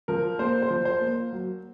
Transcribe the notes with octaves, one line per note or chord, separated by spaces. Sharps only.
F3 A#4
A#3 C5
C5
F3
C5
A#3
F#3